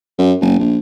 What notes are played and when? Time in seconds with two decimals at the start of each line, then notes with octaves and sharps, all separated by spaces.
0.18 F#2
0.41 F#1
0.59 A#1